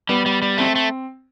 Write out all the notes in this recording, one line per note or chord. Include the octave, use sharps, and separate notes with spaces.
G3 B3
G3
G3
A3 C4
A3